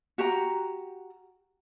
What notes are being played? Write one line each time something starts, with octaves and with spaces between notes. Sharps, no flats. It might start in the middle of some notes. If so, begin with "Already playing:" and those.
F#4 G4 G5 A#5